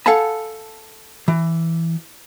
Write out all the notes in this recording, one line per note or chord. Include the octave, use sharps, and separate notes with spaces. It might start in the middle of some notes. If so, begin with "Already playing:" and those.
A4 F5 F#5 G#5 A5 B5
E3